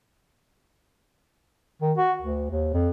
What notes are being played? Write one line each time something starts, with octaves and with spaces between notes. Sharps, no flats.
D#3
F#4
D2
D#2
F2